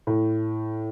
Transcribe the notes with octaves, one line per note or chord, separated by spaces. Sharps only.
A2